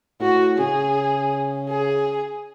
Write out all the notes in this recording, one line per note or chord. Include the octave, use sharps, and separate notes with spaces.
A2 F#4
C#3 G#4
G#4